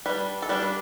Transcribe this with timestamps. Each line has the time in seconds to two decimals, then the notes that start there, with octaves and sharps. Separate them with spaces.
0.06 G3 D4 B4
0.42 A4
0.49 G3 D4 B4
0.62 B4